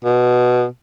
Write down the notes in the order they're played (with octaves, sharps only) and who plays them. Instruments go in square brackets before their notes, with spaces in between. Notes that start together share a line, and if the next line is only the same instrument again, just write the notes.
[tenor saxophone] B2